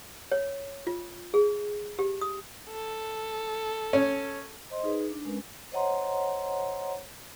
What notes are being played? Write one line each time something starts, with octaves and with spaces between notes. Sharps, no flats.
C#5
F4
G#4
G4
D#6
A4
C#4
C5 D#5 C6
D#4 G#4 B4
D4
G#3 C#4 A#4 B4
C5 C#5 D#5 F#5 A#5 C6